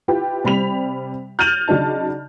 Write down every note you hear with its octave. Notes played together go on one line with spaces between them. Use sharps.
E4 F4 G4 B4
C3 G3 B5 B6 F7
F6 G6 A6 D#7 F7 F#7
C#3 F#3 D4 D#4 A5